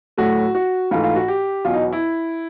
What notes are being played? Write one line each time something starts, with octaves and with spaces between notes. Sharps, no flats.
A2 F#3 A3 F#4
F#4
G#2 E3 A3 F4
F4
F#4
G4
E2 B2 F#3 F4
D#4
E4